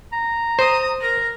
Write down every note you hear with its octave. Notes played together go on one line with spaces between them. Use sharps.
A#5
C5 D#6
A#4 A#5